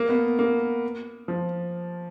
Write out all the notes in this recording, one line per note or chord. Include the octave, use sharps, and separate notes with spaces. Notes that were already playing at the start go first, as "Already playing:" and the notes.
Already playing: A#3
B3
A#3
F3